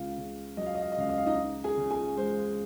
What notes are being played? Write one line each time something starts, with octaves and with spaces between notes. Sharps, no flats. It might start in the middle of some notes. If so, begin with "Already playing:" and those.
Already playing: C#2 F4 F5
C#3
F#3 D#5
F5
D#5
F5
D#5
C#2 F5
D#5
F5
D#4 D#5
D#4
G#4 G#5
C#3
G#4 G#5
G#3 C5